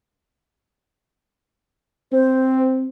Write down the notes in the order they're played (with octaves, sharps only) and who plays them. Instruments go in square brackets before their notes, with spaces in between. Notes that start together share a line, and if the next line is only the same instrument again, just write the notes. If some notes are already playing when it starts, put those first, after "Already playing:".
[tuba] C4 [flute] C5